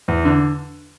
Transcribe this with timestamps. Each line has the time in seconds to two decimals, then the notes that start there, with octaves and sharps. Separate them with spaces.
0.08 E2
0.25 D3